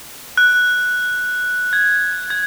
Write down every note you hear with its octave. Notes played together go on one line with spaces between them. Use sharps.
F#6
G#6
G#6